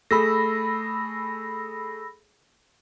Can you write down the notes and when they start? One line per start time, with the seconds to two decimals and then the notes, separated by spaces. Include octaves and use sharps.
0.11 A3 G#4 B5 E6 A#6